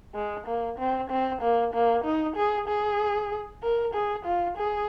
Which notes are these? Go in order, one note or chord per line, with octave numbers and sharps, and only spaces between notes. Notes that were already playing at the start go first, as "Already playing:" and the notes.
G#3
A#3
C4
C4
A#3
A#3
D#4
G#4
G#4
A#4
G#4
F4
G#4